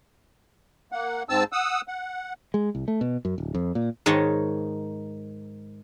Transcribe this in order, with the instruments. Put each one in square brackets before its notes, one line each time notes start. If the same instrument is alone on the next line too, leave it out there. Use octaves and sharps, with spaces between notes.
[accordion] A#3 F#5
G#2 C4 A5 E6
F#5 D#6 E6
F#5
[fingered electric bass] G#3
C2
A3
B2
F#2
D1
F2
A#2
[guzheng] G#2 D#3 C#5 D#5 A5